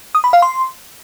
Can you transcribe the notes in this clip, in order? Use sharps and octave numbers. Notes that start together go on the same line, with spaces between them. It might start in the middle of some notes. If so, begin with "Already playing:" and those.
D#6
B5
F5
C6